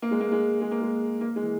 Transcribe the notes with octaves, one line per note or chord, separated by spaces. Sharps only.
A#3
G#3
A#3
G#3
G#3
A#3
G#3
A#3
G#3
E3